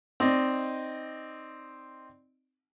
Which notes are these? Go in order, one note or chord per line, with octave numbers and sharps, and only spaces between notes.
C4 D#4 D5 D#5